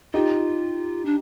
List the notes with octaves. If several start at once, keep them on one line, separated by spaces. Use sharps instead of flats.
D#4 F4 G4
D4